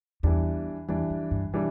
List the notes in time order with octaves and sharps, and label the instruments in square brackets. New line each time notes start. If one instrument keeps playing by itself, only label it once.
[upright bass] E2 [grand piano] E3 G3 D4
[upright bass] E2 [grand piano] E3 G3 D4
[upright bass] F2
G2
[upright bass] B2 [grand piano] E3 G3 D4